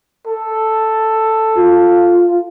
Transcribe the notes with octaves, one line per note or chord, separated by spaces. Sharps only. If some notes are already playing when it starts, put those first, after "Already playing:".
A4
F4